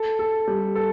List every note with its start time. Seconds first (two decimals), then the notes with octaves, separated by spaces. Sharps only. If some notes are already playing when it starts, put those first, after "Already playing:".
Already playing: A4
0.19 A4
0.47 G3
0.75 A4